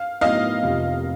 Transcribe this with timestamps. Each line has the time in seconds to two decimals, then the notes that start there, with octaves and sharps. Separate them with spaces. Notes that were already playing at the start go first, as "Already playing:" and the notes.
Already playing: F5
0.21 A2 F#3 B3 D#4 D#5 F5
0.63 F1 F2 C3